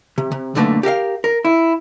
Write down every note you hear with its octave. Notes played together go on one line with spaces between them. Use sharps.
C3
C3
B1 F#2 D3 A3 A#3 B4
G4 A#4 E5 F5
A#4
E4